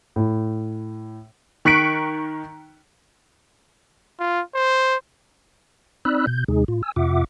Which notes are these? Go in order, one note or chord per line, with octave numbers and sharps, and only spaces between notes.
A2
D#3 C#6 F#6 B6 C#7 D7
F4
C5
C4 D#4 D5 B5 E6 F#6
B2 G6
D#2 C3 G#3 D#4 G#4
A2 F4
G#5 E6
F2 C3 F4 E5 F#5 D6